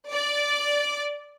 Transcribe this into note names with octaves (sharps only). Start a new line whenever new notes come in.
D5